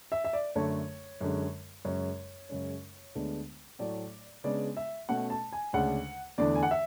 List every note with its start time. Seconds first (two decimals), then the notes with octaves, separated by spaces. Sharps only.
0.12 E5
0.25 E5
0.33 D5
0.55 F#2 D3 A3 D4 C#5
1.21 F#2 D3 G#3
1.85 F#2 C#3 G#3 C#4 C#5
2.49 F#2 C#3 G#3 C#4
3.15 D2 D3 G#3 B3 D4
3.79 A2 F#3 A3 D5
4.44 C#3 G#3 B3 D4 D5
4.77 E5
5.09 B2 A3 C#4 F#5
5.30 A5
5.53 G#5
5.73 D2 C#3 G#3 D4 F#5
6.38 E2 D3 A3 D4 D5
6.55 G#5
6.63 F#5
6.71 E5